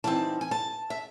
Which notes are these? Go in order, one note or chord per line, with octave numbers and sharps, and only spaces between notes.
E3 G3 C4 D#4 A5
G#5
A5
E5